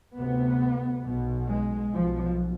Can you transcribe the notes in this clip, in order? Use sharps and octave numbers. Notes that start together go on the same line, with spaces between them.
D2 C3 B3
B1 B2
G#3
B1 B2 F3